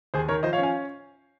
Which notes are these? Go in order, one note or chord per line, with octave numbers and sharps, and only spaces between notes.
D#2 G#4 C5
D#3 A#4 C#5
F3 C5 D#5
C#5 F5
C#4
F5 G#5